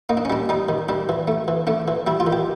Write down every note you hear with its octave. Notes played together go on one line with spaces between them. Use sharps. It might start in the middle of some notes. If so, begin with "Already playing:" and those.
A#3 D#4
D4
C#4
G3 D4
G3 D#4
D#3
G3 D4
E3
A3
E3
A3 D4
E3
G3 E4
F4
D#3
G4